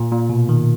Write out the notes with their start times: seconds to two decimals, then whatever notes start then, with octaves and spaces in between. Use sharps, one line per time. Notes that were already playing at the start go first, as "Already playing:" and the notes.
Already playing: A#2
0.12 A#2
0.30 B2
0.49 D#3